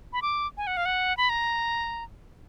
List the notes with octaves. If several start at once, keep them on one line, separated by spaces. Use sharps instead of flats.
B5
D6
G#5
F#5
F5
F#5
B5
A#5